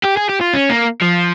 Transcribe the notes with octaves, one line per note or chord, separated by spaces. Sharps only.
G4
G#4
G4
F4
C#4
A#3
F3